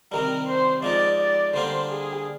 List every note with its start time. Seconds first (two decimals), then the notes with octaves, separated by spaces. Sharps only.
0.12 C3 D#3 G3 A#4
0.48 C5
0.83 F3 G#3 D#4 D5
1.19 D5
1.54 D3 G3 A#3 D4 C5
1.90 G#4